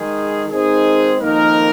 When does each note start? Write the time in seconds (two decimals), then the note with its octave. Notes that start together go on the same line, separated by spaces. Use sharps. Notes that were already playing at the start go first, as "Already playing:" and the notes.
Already playing: D#3 G#3 D#4 G#4
0.48 D#3 G#3 C4 D#4 G#4
1.20 F2 D#3 A#3 D#4 A#4